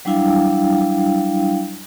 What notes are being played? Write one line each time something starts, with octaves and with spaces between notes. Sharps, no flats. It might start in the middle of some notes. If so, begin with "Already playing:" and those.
F#3 G3 D4 E4 F5 G5